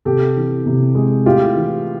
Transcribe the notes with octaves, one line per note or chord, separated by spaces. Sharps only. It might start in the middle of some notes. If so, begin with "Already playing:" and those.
C3 G4 A4
E3
C3
G#3
A2 F4 G4
E3